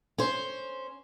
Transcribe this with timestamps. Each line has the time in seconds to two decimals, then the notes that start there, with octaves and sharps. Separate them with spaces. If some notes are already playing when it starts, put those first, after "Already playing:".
0.18 C#4 C5